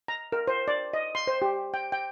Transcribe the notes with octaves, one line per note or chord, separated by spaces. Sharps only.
A#5
A#4
C5
D5
D#5
C6
C5
G4
G5
G5